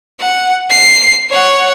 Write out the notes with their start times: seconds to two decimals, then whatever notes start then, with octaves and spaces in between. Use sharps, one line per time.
0.21 F#5
0.70 C7
1.30 C#5 F#5